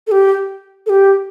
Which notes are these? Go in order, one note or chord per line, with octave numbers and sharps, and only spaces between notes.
A4
G4
A4
G4